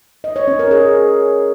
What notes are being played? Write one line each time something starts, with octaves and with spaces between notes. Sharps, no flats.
D#5
C#5
C#4
A#4
G#4